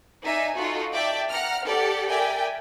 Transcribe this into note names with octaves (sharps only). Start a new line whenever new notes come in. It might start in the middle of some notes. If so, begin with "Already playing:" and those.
D#4 D5 E5 G#5
D#4 F4 F#4 A4
D5 E5 G5 A5
F#5 A#5 F6
G4 A4 D5 F#5
A#4 D5 E5 G5 G#5